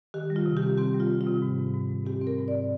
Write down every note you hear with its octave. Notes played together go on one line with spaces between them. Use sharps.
D#3 G4
G3
F4
C3
G4
C4
C4 G4
G3
F4
C4
F4
C3
G#2
G#2
G#2
G#2
C4 G4
C4
A#4
G#2
D5